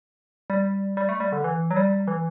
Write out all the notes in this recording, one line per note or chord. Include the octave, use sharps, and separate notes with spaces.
G3
G3
A3
G3
D3
E3
F#3
G3
E3